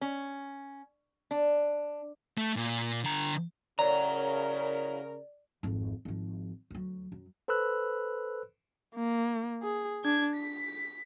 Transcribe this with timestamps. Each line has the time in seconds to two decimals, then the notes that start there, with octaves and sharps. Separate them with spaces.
0.01 C#4
1.31 D4
2.37 A3
2.56 A#2
3.04 D3 A#5
3.79 A2 C#3 F#3 A#4 D5 A#5
5.63 G#1 F2
6.05 G#1 F3
6.71 D2 F#3
7.12 F#2
7.48 A4 B4 C5 B5 E6 F#6
8.95 A#3
9.63 G#4
10.05 D4 G#6
10.36 B6